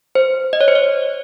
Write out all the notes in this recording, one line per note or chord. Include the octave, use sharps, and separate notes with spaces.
C5
D#5
C#5
C5
C#5